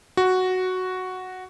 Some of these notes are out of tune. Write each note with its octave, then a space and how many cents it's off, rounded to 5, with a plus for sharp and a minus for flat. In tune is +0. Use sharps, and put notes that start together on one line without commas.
F#4 +0